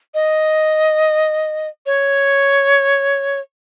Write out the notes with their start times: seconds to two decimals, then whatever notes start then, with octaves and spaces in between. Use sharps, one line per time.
0.14 D#5
1.86 C#5